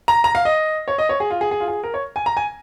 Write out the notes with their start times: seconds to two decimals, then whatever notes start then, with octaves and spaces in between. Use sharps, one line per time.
0.08 A#5
0.24 A#5
0.35 F5
0.45 D#5
0.88 C#5
0.98 D#5
1.09 C#5
1.20 G#4
1.30 F4
1.41 G#4
1.51 G#4
1.60 F4
1.68 G#4
1.84 A#4
1.94 C#5
2.16 G#5
2.26 A#5
2.37 G#5